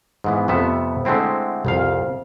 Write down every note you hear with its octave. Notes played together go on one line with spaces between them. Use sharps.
G#2 E3 B3
F2 C3 A3 B3 E5
D3 G#3 A3 C4 E4
C2 F2 F5